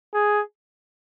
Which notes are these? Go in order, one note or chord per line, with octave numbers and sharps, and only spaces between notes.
G#4